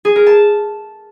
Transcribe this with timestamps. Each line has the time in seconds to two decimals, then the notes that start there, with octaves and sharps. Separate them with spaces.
0.05 G#4
0.16 A#4
0.26 A5